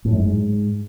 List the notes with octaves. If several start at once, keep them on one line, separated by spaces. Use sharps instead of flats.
A2
F#2
G#2